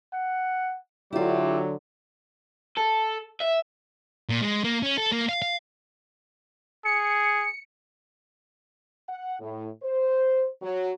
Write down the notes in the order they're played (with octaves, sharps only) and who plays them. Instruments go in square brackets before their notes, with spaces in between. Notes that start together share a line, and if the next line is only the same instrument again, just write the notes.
[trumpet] F#5
[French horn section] D3 F#3 [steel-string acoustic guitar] E4 F4 [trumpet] G4
[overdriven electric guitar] A4
E5
[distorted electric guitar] A#2
G#3
A#3
C#4
A4
A#3
F5
F5
[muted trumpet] G#4 [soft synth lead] C#7
[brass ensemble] F#5
A2
C5
F#3